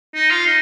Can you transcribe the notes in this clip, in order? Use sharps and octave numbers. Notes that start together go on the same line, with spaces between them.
D#4
F4
D#4